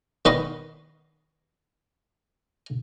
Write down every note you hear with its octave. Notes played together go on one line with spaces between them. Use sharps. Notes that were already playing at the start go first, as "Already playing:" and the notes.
D#3 B3 B4 D#5 C6 C#6